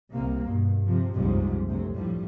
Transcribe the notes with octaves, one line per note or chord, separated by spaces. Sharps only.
C2 C3 A#3
G2 B2
C3 F3
F#1 C2 G#2 C3 F3 G3
D2 C3 F#3
A2 F3 G3